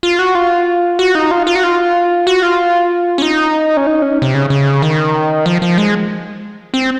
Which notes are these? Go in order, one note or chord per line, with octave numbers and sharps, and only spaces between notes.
F4
F#4
F4
F#4
D#4
F4
F4
F#4
F4
F#4
F4
C#4
D#4
C#4
D#4
C#4
C3
C#3
C#3
D#3
F3
F3
G#3
C4